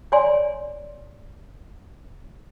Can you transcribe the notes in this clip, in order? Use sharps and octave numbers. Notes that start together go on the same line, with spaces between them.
C#5 D5 G#5 C6